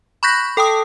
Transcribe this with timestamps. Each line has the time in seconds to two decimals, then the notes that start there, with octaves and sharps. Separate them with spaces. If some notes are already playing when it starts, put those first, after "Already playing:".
0.23 B5 C#6 F#6 G6 A#6 B6
0.57 A4 G5 A5 D#6